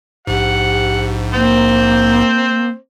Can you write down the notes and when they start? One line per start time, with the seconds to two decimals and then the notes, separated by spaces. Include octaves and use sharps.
0.27 A#1 G#2 G4 F#5
1.34 A#3 C4 C5